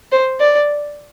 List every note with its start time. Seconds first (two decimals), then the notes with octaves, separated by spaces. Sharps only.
0.12 C5
0.40 D5